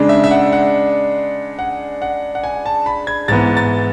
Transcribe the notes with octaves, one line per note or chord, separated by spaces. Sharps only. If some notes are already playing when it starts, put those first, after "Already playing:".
Already playing: C#3 G#3 D4
E5
E5
F#5
F#5
F#5
F#5
F#5
G#5
A5
B5
G#6
G#2 E3 B3 A6
A6